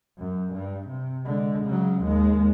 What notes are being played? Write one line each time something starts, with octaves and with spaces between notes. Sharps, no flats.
F#2
G2
C3
D3 G#3
C#3 F#3
D#2 G#3